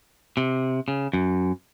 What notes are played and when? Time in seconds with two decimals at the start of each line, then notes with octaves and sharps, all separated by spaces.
0.37 C3
0.88 C#3
1.13 F#2